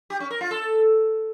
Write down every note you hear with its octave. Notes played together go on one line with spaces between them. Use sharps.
G4
C#4
A#4
F4
A4